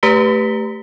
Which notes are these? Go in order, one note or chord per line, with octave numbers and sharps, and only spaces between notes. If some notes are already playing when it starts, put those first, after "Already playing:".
A3 G4 B4 A#5 B6 G7